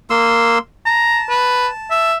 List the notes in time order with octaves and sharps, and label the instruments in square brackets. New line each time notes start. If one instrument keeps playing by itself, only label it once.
[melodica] A#3 C6 E6
[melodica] A5 [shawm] A#5
[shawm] B4
E5